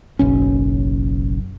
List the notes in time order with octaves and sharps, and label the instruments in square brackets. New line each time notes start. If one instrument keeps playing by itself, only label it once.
[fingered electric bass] F#1 B1 C#4